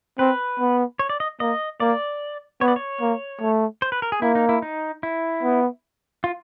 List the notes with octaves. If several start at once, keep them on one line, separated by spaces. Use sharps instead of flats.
C4 B4
B3
C#5
D5
D#5
A#3 D#5
A#3 D5
B3 C#5
D5
C#5
A#3
A3
C5
B4
A#4
G#4
A#3 E4
D#4
E4
D#4
E4
B3
F4